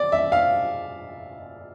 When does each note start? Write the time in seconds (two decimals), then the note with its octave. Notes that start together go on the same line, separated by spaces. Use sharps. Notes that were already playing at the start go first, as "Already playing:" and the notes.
Already playing: D5
0.12 E5
0.32 F5